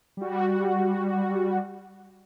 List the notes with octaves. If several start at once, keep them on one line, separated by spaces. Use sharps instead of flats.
G3 F#4